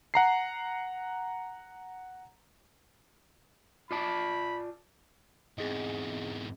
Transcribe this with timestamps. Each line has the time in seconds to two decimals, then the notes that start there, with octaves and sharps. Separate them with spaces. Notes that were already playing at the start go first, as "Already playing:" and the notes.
0.14 F#5 A#5 C7
3.91 F4 D5 A5 B5
5.58 E2 G#2 C4 G#4 D#5